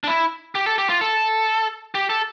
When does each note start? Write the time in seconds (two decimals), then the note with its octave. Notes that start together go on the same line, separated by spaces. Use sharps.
0.04 D4
0.08 E4
0.55 G4
0.66 A4
0.78 G4
0.89 F4
1.01 A4
1.95 G4
2.10 A4